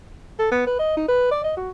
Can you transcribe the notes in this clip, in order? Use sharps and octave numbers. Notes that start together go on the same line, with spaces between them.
A4
B3
B4
D#5
D#4
B4
D5
D#5
F#4